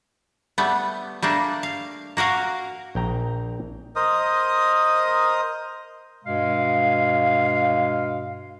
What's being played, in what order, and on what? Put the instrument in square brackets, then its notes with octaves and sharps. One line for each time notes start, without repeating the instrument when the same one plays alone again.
[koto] G3 A3 B3
G3 A3 A#3 D4
F5
A#3 F#4 A#4 F5
[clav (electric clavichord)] A#1 G5 A#5
[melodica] A#4 C5 D#5 D#6
[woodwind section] G2 B2 G#3 F5